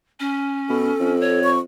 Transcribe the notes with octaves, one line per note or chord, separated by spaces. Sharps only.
C#4
B2 A4
F2
C#5
C#6